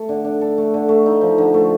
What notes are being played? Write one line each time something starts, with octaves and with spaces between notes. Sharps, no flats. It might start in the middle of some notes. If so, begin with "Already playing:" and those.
Already playing: A3 A4
D3
D4
A4
A3
D3
A3
D#4
F3
D3
A3